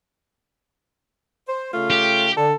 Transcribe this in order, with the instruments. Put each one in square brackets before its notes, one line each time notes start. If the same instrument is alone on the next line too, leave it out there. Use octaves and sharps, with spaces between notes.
[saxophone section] C5
C#3 A3 F4
[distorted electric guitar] G4
[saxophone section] D3 [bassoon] A4